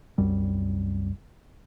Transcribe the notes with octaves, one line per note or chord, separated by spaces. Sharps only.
C2 F#2 G3